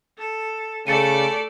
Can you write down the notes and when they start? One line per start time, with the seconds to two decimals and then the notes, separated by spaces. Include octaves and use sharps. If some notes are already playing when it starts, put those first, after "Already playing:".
0.18 A4
0.87 C#3 A3 A4 D5 A6 C#7 D#7